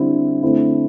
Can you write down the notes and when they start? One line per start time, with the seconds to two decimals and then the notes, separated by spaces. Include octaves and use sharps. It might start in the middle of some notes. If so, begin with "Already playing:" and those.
Already playing: D3 G3 C4 E4
0.43 D3 A3 C4 E4